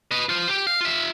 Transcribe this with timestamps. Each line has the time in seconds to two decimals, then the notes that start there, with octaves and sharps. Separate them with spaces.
0.11 B4 D#5
0.29 F4 C5
0.49 G4
0.67 F5
0.81 F4 E5